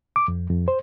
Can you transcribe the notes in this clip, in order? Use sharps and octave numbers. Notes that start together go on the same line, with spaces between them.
D6
F2
F2
C5